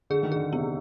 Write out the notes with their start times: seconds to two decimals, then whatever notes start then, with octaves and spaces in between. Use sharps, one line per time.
0.10 D3 G#4
0.23 D#3
0.32 D3 G#4
0.53 C3 B3